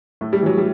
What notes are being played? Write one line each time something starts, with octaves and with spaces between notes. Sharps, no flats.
A2 A3
G3
E3 F#3
G3